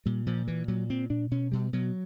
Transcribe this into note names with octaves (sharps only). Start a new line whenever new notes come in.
A#2 G3
A#2 F3
A#2 E3
A#2 F#3
A#2 C4
A#2 D4
B2 C#4
B2 G3
B2 F#3